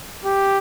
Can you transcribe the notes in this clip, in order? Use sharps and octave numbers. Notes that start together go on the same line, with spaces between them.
G4